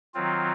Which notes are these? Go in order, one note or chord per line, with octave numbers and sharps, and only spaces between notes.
D#3 F#3 C4 F4